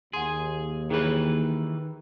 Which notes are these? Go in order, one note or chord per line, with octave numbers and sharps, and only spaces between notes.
D#2 G#4 F#5 G#5 C6
D#3 E3 G#4 B4 C#5